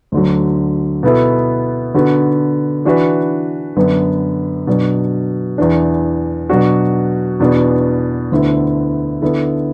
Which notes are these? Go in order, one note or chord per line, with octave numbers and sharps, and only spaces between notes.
D2 D3 F#3
B2 B3 E4 A4
D3 B3 F#4
E3 D4 F#4 B4
F#2 D3 B3 D4 B4
B2 F#3 D4
E2 E3 D4
B2 F#3 D4 F#4
E2 B2 B3 D4
D2 D3 B3 E4
D3 B3 E4 A4